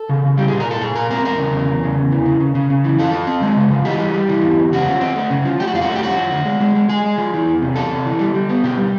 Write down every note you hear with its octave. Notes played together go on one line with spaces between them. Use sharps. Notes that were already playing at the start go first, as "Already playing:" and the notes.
Already playing: A4
C#3
C#3
G3 G4
A#2 G#4
A#4
A#2 A4
A#2 G#4
A#2 A#4
C4 A#4
E2 A#4
C#3
E2
E2
C#3
E2
E3
C#3
C#3
C#3
C#3
E3
F3 A4
F3
C4
G#3
C#3
F3
E3 G4
G3
G3
E3
E2
E2
C#3 F#4
F3
C4
A3
C#3
F3
A3 G4
F#4
F2 F4
F#4
A3
G4
F2 F#4
F3
D3
G#3
G#3
G#3
G#3 G#4
G#3
F3
E3
E2
C3
E2 A4
C3
E3
G3
G3
B3
B2 G4
G3